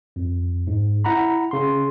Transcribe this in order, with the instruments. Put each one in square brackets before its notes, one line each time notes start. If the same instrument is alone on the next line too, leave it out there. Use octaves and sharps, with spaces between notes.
[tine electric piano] F2
G#2
E4 F#5 A#5 B5
C#3 C6